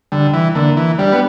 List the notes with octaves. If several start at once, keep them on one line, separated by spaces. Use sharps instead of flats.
D3 G3
E3
D3 A#3
E3
G3 D4
B3